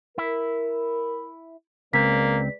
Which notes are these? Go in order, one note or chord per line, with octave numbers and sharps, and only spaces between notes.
E4 A#4
C#2 G#3 A#3 C4 B4 D5 B6